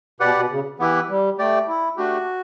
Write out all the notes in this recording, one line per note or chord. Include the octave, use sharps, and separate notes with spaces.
B2 G4 B4 D5 F#5
B2
C#3
E3 B3 E4 G4 B4
G3
A3 G4 D5 G5
E4
A3 D4 F#4 G4